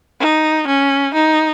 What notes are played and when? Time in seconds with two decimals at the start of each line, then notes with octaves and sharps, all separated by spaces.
0.20 D#4
0.67 C#4
1.14 D#4